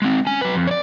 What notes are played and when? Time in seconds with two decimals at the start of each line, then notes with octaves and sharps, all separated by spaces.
0.02 G#3 C4
0.27 C#4 G#5
0.41 F#3 B4
0.55 F2
0.67 C#5 D5